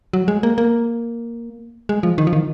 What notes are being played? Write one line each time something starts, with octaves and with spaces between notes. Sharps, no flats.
F#3
G#3
A#3
A#3
G#3
F3
D#3
F3
D#3